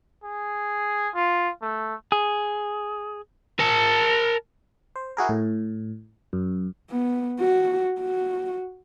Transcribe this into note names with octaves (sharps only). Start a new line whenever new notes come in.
G#4
F4
A3
G#4
A#4 A5
C5
E4 F#4 G#4 A#4
A2
F#2
B3
F#4
F#4